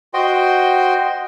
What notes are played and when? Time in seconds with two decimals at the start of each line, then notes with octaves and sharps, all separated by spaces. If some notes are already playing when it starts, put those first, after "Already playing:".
0.14 F#4 C5 D#5 G5 C6